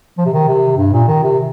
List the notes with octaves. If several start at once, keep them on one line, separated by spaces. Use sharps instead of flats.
F3
C3
D#3
C3
G2
A#2
D#3
C3